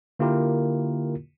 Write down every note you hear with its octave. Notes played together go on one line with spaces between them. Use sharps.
D3 A#3 E4 F4 G4 A#4